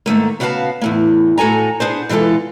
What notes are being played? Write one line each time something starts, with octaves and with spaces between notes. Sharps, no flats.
G#2 D#3 A3 A#3
C#3 B3 F#4 C5 F5 A5
E2 A2 A#3
A2 F#4 A4 G#5 A#5
B3 D4 G#4 C5
B2 E3 G#3 F4 A4